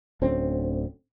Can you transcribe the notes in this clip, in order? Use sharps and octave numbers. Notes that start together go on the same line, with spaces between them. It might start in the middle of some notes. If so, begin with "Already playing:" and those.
D1 D2 C4 C#4